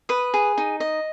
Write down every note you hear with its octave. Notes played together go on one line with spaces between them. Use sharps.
B4 D#6
G#4
D#4
D#5